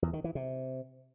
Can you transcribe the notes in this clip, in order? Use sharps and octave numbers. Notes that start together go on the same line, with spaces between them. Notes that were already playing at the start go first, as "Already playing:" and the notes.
E2
D#3
E3
C3